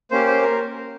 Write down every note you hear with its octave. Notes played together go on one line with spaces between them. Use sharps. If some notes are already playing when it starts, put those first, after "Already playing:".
A#3 C#4 G4 C5
C5
A#4